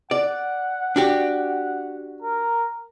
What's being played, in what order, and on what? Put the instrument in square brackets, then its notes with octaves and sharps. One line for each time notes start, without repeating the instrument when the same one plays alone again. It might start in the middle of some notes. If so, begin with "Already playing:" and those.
[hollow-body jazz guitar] D5 [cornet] F#5
[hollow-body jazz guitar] D4 F#4 G4
[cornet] A#4